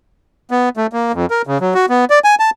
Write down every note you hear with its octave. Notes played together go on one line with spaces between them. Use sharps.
B3
A3
A#3
F2
A#4
C#3
F#3
F#4
B3
D5
G#5
A5